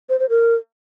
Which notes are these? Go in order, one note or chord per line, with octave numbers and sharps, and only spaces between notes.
C5
C5
A#4